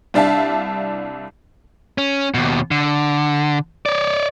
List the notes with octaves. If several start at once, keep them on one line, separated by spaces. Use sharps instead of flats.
C2 D4 E5 F5 A5
C#4
D#2 B2
D3
C#5 D5